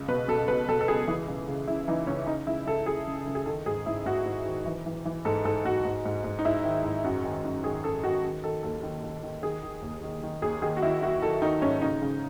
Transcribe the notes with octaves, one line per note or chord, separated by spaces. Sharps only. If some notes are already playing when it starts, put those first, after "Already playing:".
Already playing: C#2
B2 B4
B2 A4
C#2 B4
B2 A4
A4
C#2 G#4
E3
C#2
C#3
C#3 E4
E3 D#4
C#2 C#4
C#2 D#4
C#2 E4
C#2 A4
C#2 G#4
C#3
C#2
G#4
D#3 A4
G#2 G#4
G#2 E4
G#2 F#4
G#2
D#3
E3
E3
E3
G#2 A4
G#2 A4
G#2 F#4
G#2
G#2
G#2
D#4
G#2 E4
D#3
G#2
F#2 F#4
D#3
F#2
D#3 G#4
F#2 A4
D#3 F#4
D#3
D#3 A4
D#2 A4
D#3
D#3
D#3
D#3 G#4
D#3
D#2
D#3
D#3
D#2 G#4
D#3 G#4
F#4
D#3 E4
D#3 F#4
D#3 A4
D#3 D#4
G#2 C#4
C#3 D#4
C#3